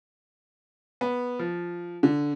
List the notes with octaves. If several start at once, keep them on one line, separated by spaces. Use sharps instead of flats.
B3
F3
D3